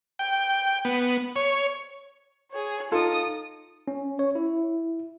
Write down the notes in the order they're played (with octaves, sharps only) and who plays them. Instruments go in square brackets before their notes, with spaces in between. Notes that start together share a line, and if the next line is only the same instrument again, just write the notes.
[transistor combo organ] G5
B3
C#5
[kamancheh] G#4 C#5
[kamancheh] D#4 D#6 [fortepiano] F4 A4
[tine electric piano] C#4
C#5
E4